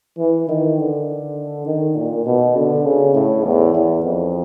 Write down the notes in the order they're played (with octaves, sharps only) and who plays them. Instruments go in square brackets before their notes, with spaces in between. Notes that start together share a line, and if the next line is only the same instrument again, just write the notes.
[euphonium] E3
D#3
D3
D#3
A#2
B2
D3
C#3
A2
E2
E2
F2